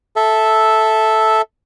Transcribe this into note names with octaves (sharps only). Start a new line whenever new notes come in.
A4 E5